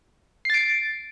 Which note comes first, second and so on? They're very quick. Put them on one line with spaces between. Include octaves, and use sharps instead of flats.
C7 A6 D7